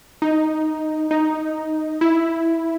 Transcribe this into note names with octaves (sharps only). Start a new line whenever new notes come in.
D#4
D#4
E4